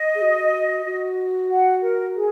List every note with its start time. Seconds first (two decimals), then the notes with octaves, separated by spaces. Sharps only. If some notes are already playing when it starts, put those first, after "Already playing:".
Already playing: D#5
0.15 G#4
0.22 F#4
0.86 F#4
1.51 F#5
1.82 A#4
2.15 G#4